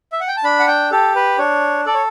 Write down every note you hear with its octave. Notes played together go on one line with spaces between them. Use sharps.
E5
F#5
G5
A5
D4 B5
F#5
G5
G4 A4
B4
D4 C#5
A4 D5
C#5